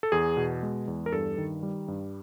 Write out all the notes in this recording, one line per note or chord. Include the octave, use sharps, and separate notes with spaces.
A4
E2 G#4
B2
G#3
E2
A#4
G2 A4
D#3
G3
G2